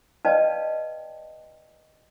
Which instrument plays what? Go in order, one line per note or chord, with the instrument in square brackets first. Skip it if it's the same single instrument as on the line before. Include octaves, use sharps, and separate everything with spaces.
[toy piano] B4 D5 D#5 F5 G5 A5